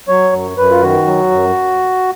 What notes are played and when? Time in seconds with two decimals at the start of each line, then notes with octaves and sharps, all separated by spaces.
0.08 F#3 C#5
0.33 F#2
0.58 F#2 B4
0.71 F4
0.82 D#3 F#4
1.06 F#3
1.31 F#2